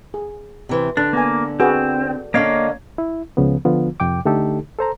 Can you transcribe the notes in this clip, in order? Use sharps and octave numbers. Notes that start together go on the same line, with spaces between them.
G#4
C3 E3 C5
D3 D4
A#3 B3 G#5
C4 F#4 G#4 B4
D3 A#3 C#4 C#5 D#5 F5
E4
C#2 C#3 F3 B3
D3 F3 B3 F4
F2 C3 G5 D6
D3 A3 D#4 G4 A4
A4 C5 A#5